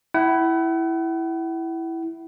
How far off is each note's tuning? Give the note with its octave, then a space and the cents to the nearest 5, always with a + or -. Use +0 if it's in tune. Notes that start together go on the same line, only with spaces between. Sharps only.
E4 +0 F#5 +40